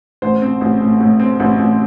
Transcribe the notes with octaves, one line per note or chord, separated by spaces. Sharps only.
A1 C5
C4
A1
A2
A2
C4
A1
A1